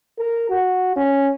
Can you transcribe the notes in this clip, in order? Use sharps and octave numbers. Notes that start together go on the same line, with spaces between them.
A#4
F#4
C#4